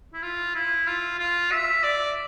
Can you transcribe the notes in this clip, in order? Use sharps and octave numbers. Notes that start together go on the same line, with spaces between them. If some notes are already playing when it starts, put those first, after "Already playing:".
E4
F4
E4
F4
F4
E5
D5